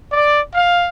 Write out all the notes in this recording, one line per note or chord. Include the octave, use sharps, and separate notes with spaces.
D5
F5